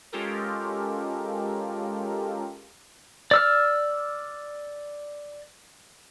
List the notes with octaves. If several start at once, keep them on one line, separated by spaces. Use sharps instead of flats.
G#3 C#4 F4 G4 A4 A#4
D5 E6 F6